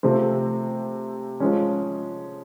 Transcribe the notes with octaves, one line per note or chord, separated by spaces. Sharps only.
C3 F3 A3 C4
F3 G#3 C#4